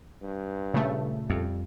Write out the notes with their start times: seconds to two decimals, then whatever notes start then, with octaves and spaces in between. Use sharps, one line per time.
0.22 G2
0.74 A#2 C#3 A3
1.30 F2 G3